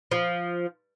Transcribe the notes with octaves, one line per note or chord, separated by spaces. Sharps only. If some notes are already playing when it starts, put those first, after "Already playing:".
F3